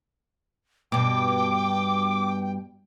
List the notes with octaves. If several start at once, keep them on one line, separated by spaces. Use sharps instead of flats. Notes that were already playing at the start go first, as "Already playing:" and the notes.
G2 B2 G5 D6